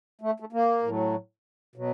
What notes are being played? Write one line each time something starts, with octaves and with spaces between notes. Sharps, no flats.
A3
A3
A#3
A2 F#3
B2 F#3